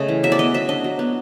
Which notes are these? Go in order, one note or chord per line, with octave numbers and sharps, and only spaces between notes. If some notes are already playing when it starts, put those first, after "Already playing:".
Already playing: C#3 A3 D#5
E3
F#3 E5
D5
B3 D#5
F#3 E5
D4 D#5
F#3
B3